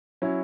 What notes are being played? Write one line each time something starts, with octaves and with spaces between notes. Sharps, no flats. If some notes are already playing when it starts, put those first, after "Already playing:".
F#3 C#4 E4